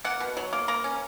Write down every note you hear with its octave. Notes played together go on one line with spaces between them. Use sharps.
A#3 F#5
B2
F#3
A#3
A#3 A#5
C#4